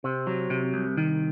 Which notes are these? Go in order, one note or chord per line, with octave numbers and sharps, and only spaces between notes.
C3 C4
F#3
C3
C2
D#3